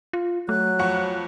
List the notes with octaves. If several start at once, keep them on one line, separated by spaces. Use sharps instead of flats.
F4
F#3 A3 F#6
F2 F#5 C#6